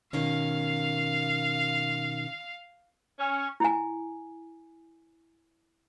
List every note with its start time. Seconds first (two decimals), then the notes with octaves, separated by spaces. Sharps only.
0.13 B2 D#3 C#4 F5
3.19 C#4
3.60 E4 G#5